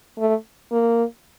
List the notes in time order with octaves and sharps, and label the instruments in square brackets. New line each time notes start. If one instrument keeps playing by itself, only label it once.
[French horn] A3
A#3